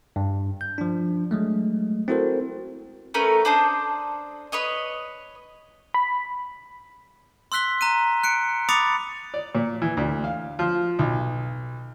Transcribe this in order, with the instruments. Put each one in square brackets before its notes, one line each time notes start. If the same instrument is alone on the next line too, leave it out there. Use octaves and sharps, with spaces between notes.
[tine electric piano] G2
G6
F3 D4
F#3 G#3 A3
C4 E4 F#4 A4 A#4 C5
[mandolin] A3 C#4 A#4 B4
D4 C5 A5 D#6
B4 C#5 D#5 C#6
[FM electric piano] B5
[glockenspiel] C6 E6 F#6 B6 G7
A#5 F#6 D#7
F#6 C#7 D7
B5 D6 D#6 A6 C#7 F7
[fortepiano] D5
A#2
E3
D2
F5
F3
B1